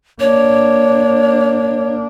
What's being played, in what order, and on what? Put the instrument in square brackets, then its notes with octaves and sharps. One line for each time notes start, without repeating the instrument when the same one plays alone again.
[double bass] A#3 D4 [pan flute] C#5